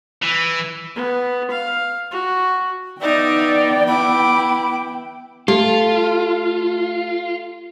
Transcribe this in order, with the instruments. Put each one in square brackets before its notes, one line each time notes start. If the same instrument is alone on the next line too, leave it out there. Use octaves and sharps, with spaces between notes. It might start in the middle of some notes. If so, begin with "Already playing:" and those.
[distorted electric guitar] E3
[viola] B3
F5
F#4
[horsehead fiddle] B3 G5 [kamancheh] D#4 E5 [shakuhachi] D5
[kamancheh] E4 D6 [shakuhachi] B5
[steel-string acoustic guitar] A3 [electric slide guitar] F4 [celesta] G4